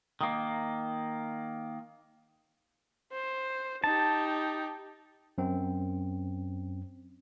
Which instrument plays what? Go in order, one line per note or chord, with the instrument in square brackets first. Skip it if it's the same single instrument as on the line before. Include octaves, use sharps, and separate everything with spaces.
[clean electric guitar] D#3 A#3
[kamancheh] C5
[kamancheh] D#4 G4 [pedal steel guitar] A5
[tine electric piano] F#2 C4